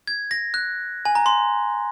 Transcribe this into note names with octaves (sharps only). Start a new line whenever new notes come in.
G#6
A#6
F#6
G#5
A#5
C6